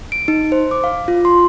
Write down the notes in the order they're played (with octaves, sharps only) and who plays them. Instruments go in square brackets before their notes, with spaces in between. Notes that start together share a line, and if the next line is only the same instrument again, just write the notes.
[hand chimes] D7
D#4
C5
D6
F5
F4
C6